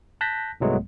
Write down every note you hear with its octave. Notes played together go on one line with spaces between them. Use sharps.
A5 F#6 G6 A#6 B6
C2 G#2 F#3 G#3 A3 B3